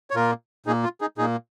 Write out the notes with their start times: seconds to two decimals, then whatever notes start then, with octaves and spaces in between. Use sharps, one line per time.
0.10 C#5
0.15 A#2 A#3 F4 A#4
0.66 A#2 A#3 D#4 G#4
0.83 F4
1.01 D#4 G#4
1.18 A#2 A#3 D#4 G#4